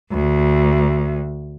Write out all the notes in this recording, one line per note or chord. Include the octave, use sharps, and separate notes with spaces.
D2